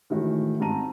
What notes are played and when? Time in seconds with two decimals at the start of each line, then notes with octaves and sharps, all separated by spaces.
0.10 A2 D#3 E3 G#3 E4 F#4
0.60 G#2 C4 A5 A#5 D#7